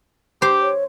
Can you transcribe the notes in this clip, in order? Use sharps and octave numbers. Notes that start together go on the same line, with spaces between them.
G4 C5 D6
C#5